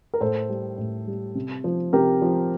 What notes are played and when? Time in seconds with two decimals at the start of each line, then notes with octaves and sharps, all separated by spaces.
0.14 A#4
0.20 A2 A4 C5
0.49 G3
0.78 A2
1.07 G3
1.35 C3
1.64 F3
1.93 C3 G4 A#4
2.22 F3